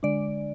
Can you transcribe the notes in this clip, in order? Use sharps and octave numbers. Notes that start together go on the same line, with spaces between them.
D3 G#3 D4 D5